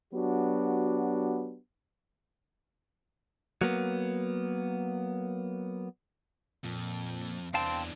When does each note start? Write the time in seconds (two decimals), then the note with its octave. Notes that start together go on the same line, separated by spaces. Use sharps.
0.14 F#3 B3 D4 F#4 G4
3.61 F#3 A#3 B3
6.64 F2 A#2
7.54 E2 E3 C4 D4 F5 G5 A5